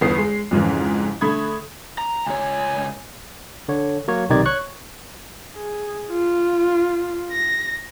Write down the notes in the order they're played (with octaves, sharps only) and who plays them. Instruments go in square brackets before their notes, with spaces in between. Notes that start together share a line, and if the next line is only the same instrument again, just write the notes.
[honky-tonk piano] G1 E2 B3 D#6 C7
G#3
F2 G#2 C#3 E3
D3 A3 B5 D#6 G#6
[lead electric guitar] A#5
[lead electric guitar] C#2 C#5 [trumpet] G#5
[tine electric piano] D3 C#5
F#3 A#3 C#5
B1 C3 D#3 D#4 D5 G#6
C#5 C#6 F#6
[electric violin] G#4
F4
A#6